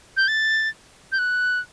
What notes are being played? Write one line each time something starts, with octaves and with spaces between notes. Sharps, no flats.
G6
A6
G6
F#6